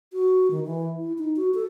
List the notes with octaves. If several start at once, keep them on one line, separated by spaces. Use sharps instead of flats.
F#4
D#3
E3
E4
D#4
F#4
A4